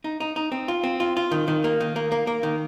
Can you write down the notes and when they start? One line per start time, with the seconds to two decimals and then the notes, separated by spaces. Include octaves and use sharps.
0.04 D#4
0.20 D#4
0.36 D#4
0.52 C4
0.68 F4
0.84 C4
1.00 F4
1.17 F4
1.31 D#3
1.48 D#3
1.64 A#3
1.80 D#3
1.96 A#3
2.12 A#3
2.27 A#3
2.43 D#3